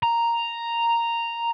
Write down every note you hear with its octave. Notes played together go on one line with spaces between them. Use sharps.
A#5